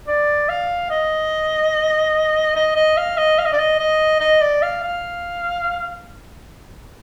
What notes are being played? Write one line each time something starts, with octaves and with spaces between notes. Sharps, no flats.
D5
F5
D#5
D#5
D#5
F5
D#5
F5
D#5
D5
D#5
D#5
D#5
D5
F5
F5